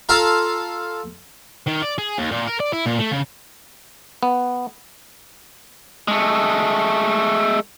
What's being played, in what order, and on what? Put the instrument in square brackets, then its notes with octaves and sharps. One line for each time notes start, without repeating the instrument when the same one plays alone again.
[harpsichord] F4 A4 F5 A#5
[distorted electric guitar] D#3
D5
G#4
D#2
A#2
A#4
D5
E4
A#2
A3
C#3
[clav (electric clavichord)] B3
[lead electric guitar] G#3 A3